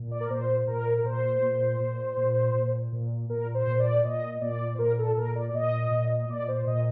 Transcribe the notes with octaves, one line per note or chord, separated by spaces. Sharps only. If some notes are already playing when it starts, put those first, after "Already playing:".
Already playing: A#2
D5
A#4
A#2 C5
A#2 A#4
A#4
A#2 C5
A#2
A#2
A#2
A#2
A#2
A#2 A#4
C5
A#2
D5
A#2 D#5
A#2 D5
C5
A#2 A#4
A4
A#2 A#4
D5
D5
A#2 D#5
A#2
D#5
A#2 D5
C5
A#2 D#5